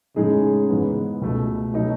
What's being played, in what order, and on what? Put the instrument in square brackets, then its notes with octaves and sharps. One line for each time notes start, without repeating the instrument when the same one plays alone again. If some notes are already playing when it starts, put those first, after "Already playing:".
[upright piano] A2 G#3 D#4 G#4 [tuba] C#3
[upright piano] G#2 E3 B3
C#2 B2 A3
B2 F#3 A3 D#4